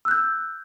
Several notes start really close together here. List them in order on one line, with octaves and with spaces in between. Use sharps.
E6 F#6 G6